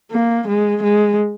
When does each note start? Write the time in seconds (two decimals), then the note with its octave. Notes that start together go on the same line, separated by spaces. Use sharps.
0.12 A#3
0.48 G#3
0.84 G#3